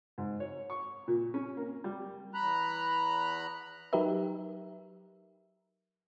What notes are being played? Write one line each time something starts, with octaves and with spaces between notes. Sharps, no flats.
G#2
C#5
C#6
A#2
C#4
A#3
G3
E2 A#5 B5 F#6
F#3 D#4 G4 A#4 B4 E5